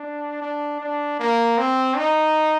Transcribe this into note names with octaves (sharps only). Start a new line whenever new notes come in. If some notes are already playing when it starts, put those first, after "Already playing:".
Already playing: D4
D4
D4
A#3
C4
D#4